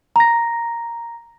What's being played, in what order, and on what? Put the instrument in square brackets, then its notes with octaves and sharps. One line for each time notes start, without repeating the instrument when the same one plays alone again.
[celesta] A#5 A#6